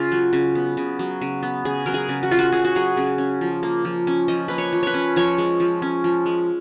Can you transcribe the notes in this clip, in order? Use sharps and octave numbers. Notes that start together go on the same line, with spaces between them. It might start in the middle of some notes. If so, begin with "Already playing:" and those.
Already playing: C#3 F4
F#3
C#3
B3
C#3
F#3
C#3
B3
C#3 G#4
F#3 A#4
G#4
C#3
F#4
C#4 F4
F#4
C#3 G#4
F#4
F#3 G#4
C#3
C#4
F3
A#3
F3
C#4
F3 D#5
A#3 B4
C#5
F3
B4 C#5
C#4
F3 C#5
G#3
F3
C#4
F3
G#3